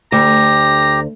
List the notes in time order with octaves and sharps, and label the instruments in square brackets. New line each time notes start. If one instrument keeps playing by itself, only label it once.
[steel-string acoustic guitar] D2 [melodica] G4 [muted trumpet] A#5